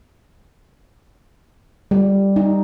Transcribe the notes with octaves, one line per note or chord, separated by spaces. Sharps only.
G3
D#4